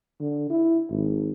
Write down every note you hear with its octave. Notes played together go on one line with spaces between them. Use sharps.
D3
E4
G#1